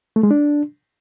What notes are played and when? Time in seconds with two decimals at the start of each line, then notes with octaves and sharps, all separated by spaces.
0.16 A3
0.23 G#3
0.31 D4